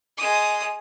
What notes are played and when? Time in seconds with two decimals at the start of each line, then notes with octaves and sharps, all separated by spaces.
0.17 G#3 D#6